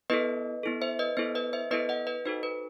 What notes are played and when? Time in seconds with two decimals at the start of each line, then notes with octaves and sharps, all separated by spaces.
0.10 B3 E4 A4 B4 D#5
0.63 B3 E4 A4
0.82 C5 E5
0.99 B4 D#5
1.17 B3 E4 A4 C5
1.35 B4 D#5
1.53 C5 E5
1.71 B3 E4 A4 B4 D#5
1.89 D#5 F#5
2.07 B4 D#5
2.25 D#4 F#4 A4 C5
2.43 B4